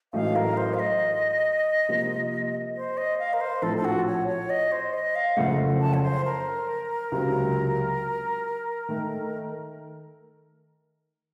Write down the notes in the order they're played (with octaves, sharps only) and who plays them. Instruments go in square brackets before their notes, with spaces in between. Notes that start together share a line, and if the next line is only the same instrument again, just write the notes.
[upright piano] A1 A2 F#3 A3 D#4 [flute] F5
[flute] A#4
C5
F5
D#5
[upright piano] C3 F3 A#3 F4
[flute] C5
D#5
F5
A#4
C5
[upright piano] A#1 A2 F3 C4 [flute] A4
[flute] A4
F#4
C#5
C#5
D#5
C5
D#5
F5
[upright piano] F#1 F2 C#3 A3 [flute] F#5
[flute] A5
C#5
C5
A#4
[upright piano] C#2 C3 F#3
D#3 A3